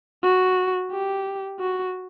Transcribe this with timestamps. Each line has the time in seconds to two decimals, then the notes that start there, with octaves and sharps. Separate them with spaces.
0.23 F#4
0.91 G4
1.60 F#4